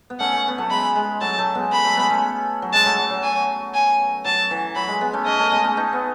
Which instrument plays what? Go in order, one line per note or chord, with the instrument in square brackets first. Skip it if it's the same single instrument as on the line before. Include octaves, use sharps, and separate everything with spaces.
[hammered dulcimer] B3
[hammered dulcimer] A3 C#4 [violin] F#5
[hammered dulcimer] A3 C#4
B3
F#3 A3
[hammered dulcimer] G#3 [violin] B5
[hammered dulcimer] G#3
[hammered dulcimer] F#3 A3 [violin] A5
[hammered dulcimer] F#3 A3
G#3 B3
[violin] B5
[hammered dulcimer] F#3 A3
G#3 B3
A3 C#4
F#3
[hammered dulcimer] G#3 [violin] A5
[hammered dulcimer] F#3 A3
F#3
F#3
[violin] G#5
G#5
[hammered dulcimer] F#3 [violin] A5
[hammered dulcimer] E3
[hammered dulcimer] F#3 [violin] B5
[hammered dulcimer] G#3
G#3 B3
A3 C#4
[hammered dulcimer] A3 C#4 [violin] D#5
[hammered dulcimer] A3 C#4
G#3 B3
A3 C#4
B3 D#4
B3